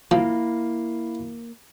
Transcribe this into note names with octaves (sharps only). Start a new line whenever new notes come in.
F3 A#3 E4 F5